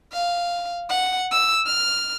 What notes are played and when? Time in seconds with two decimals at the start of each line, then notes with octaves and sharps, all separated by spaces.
0.13 F5
0.89 F#5
1.31 E6
1.66 F6